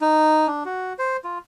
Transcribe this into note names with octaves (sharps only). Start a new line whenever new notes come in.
D#4
D4
F#4
C5
F4